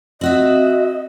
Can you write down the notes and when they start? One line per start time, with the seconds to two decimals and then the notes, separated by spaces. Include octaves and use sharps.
0.21 C4 F#4 D#5 E5